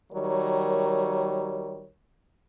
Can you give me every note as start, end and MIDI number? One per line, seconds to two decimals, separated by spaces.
0.13 1.88 51
0.13 1.88 54
0.13 1.88 55
0.13 1.88 70
0.13 1.88 73